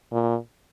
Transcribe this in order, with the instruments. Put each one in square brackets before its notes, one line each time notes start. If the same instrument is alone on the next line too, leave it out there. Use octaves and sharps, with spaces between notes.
[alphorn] A#2